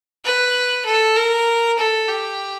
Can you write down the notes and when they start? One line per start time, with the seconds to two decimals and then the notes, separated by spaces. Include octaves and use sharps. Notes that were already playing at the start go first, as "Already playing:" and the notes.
0.25 B4
0.86 A4
1.16 A#4
1.78 A4
2.08 G4